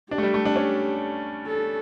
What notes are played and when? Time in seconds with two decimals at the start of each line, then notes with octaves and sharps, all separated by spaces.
0.11 D4 G4
0.18 A3
0.23 G3
0.34 A3
0.45 D4
0.56 C#4
1.47 A4